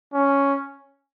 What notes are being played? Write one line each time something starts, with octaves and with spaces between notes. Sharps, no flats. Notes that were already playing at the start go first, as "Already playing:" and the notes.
C#4